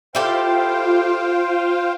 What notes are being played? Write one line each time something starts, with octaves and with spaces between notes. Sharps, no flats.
E4 F4 G4 A4 C5 F5 G5